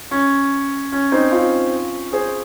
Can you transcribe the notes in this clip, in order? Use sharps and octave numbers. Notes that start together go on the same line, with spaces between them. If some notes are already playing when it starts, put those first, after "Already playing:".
C#4
C#4
C4 D#4
C#4 F4
G#4 C5